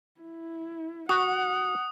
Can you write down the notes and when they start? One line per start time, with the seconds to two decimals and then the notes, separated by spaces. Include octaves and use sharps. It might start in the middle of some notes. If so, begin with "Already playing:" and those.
0.21 E4
1.09 F#4 F#5 D#6